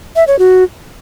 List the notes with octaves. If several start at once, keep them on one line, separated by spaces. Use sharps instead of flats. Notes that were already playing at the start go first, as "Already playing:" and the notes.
E5
C#5
F#4